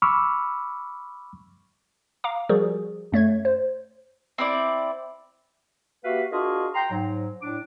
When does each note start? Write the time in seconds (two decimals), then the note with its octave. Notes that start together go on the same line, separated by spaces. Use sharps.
0.02 B5 C#6 D6 E6 F6
2.24 F5 A#5 D6
2.49 F3 G3 F#4 G#4 A#4
3.12 F#2 A3 C#5 G#6
3.45 C5
4.38 C4 E4 D5
6.04 A#3 F#4 G4 B4 E5 F5
6.32 D4 F4 F#4 G#4 A#4 D#5
6.75 G5 A#5 C6
6.91 G#2 F#3
7.42 A2 D4 D6